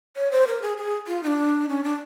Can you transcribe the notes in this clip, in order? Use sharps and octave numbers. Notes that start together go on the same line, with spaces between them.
C#5
C5
A#4
G#4
G#4
F4
D#4
D4
C#4
D4